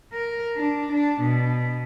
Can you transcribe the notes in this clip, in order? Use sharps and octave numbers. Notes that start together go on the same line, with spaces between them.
A#4
D4
D4
B2